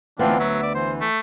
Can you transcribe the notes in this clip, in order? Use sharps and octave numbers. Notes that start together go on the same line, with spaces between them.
D2 E3 B3 C4 D4 F4
F#3 E5
D5
E3 C5
A3